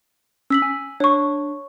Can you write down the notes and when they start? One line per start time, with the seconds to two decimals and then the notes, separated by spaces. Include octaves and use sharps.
0.50 C#4 E6 B6 F#7
0.62 G#5
1.00 D4 C#5 C#6